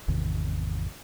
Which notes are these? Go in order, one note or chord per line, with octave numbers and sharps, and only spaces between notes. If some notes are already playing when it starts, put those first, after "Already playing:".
G#1 E2 C3 D#3